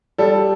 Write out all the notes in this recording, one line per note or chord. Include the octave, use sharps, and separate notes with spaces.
G3 A4